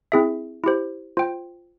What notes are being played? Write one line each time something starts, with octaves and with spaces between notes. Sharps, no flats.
C4 E4 G#4 E5
E4 G4 C5
F4 C5 G5